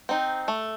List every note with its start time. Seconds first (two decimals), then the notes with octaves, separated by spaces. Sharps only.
0.09 C4 D#4
0.48 A3